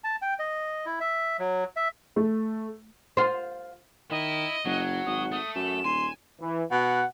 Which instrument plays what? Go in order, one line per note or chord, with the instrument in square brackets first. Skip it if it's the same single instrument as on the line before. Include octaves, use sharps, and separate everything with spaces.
[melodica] A5
G5
D#5
E4
E5
F#3
E5
[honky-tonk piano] A3
[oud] F4 C5
[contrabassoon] D#3 [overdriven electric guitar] E4 [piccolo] D#5
[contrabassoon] F#1 [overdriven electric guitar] F#3 [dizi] F#5
[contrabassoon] G#1 [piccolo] D#6
[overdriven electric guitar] A3 [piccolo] D#6
[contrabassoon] F#2 [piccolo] E7
[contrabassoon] D#1 [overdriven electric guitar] G#5 [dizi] C6
[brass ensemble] E3
[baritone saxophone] B2 [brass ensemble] F#5